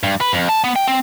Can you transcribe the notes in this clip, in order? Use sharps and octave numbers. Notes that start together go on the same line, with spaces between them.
G2
B4
F2
A5
B3
G5
C4